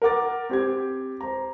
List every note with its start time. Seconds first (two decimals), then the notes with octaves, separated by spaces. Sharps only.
0.02 A#4 F#5 D6 A6
0.49 C4 G4 G#6
1.21 C5 A#5